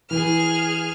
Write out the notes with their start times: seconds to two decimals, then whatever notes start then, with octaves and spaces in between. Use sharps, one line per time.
0.11 E3 G#4 F6